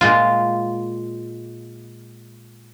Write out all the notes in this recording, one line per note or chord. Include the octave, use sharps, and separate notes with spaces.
A#2 G#3 F4